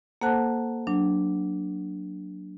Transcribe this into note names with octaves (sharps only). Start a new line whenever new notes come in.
A#3 A4 C5 F#5 A5 F#6
F#3 D4